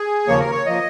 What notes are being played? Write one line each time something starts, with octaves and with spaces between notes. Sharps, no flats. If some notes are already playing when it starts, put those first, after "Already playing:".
Already playing: G#4
D#2 C#3 F3 A#3 C#5
A#4
C#5
F3 A#3 D#5